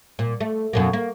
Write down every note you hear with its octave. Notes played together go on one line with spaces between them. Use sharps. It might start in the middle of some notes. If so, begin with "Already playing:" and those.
A#2
A3
F#2 B2 A#3
A#3